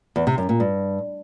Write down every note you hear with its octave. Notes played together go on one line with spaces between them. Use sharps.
E2
C3
F#2
A#2
G2